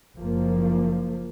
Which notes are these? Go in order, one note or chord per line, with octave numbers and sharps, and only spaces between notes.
F#1 F3 A#3